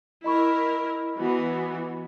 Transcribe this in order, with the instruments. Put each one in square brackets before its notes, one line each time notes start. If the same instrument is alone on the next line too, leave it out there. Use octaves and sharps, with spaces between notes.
[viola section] E4 A#4 [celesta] D#5 B5 C#6
[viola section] E3 B3 F#4